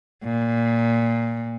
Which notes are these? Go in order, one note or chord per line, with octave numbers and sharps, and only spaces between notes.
A#2